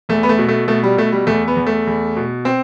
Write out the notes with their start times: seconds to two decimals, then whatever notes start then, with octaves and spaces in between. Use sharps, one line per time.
0.09 E2 A3
0.23 B3
0.29 A3
0.39 B2
0.49 A3
0.68 B2 A3
0.83 G3
0.97 B2 A3
1.12 G3
1.27 E2 A3
1.48 B3
1.57 E2
1.66 A3
1.87 E2
2.17 B2
2.45 C4